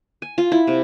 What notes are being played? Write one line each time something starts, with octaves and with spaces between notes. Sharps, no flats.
G#5
F4
E4
C3